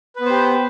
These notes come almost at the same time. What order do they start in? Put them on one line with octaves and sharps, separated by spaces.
B4 B3 C5 G4